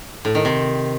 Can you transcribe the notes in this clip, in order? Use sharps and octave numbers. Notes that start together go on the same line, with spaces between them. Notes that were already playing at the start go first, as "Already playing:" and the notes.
A2
D#3
C3